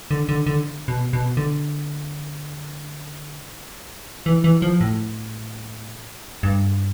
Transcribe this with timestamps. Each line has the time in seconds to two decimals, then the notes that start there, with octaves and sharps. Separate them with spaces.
0.11 D3
0.29 D3
0.46 D3
0.88 B2
1.13 B2
1.37 D3
4.26 E3
4.44 E3
4.62 F3
4.81 A2
6.43 G2